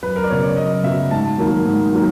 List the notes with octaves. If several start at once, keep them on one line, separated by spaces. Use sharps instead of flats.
F#2 B4
A#4
D5
C#3 F#3 B3 C#5
D5
F#2 D#5
C#3 F#3 B3 E5
G#2 A5
D#3 F#3 A#3
G#2
D#3 F#3 A#3